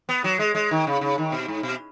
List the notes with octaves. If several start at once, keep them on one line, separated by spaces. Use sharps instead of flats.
B3
F#3
G#3
G#3
D#3
C#3
C#3
D#3
B2
G#2
B2